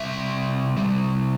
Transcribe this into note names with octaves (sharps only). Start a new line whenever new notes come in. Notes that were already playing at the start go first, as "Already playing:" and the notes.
Already playing: C3 G3 E5
C3 G3